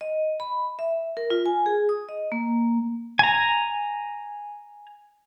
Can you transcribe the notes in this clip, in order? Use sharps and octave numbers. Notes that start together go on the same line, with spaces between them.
D#5
B5
E5
A#4
F4
G#5
G#4
D#6
D#5
A#3
G#5 A#5